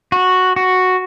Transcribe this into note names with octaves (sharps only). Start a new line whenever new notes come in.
F#4
F#4